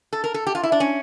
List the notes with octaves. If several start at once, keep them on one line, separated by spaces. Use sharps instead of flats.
A4
A#4
A4
G4
F4
E4
D4
C#4